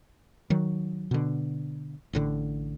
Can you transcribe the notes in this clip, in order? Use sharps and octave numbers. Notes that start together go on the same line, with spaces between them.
D#3 F#3
B2 D3
A1 A2 D3